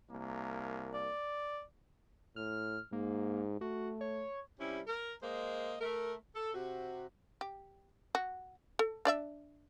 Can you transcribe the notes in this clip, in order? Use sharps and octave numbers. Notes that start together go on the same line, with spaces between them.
C2 A#3
D5
A2 F6
G#2 A#3
A3 F#4
C#5
C3 G3 C#4 E4
A#4
G#3 A#3 C5 D#5
A3 A#4
A4
C3 F#4
G4
F#4
A4
D4 D5 E5